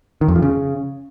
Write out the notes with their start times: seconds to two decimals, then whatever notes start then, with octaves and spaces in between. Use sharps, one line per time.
0.21 D#3
0.28 F2
0.35 F3
0.42 C#3